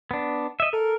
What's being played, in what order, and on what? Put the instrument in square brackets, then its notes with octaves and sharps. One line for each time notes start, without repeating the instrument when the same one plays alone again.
[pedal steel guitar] B3 D4
D#5 E5
[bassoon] A4 [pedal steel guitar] A#4